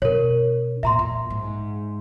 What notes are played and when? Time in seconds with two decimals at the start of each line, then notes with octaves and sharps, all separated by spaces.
0.02 B2 D4 A#4 C#5
0.83 E2 A2 E5 A#5 C6
0.99 A#2
1.30 G#2